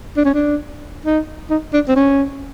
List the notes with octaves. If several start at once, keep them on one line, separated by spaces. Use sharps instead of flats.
D4
C#4
D4
D#4
D#4
D4
C4
C#4